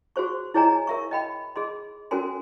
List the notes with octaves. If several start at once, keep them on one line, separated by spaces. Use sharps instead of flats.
F#4 G#4 C5 C#6
E4 G#4 C#5 D#5 G#5 A#5
A#4 E5 C#6
D#5 G5 B5
G#4 D#5 C6
C#4 F#4 A4 A#4 G#5 C6